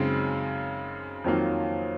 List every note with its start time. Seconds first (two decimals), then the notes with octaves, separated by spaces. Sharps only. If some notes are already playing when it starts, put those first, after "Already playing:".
Already playing: F#2 C#3 G#3 C4 D#4
1.24 F2 D#3 F#3 A#3 F4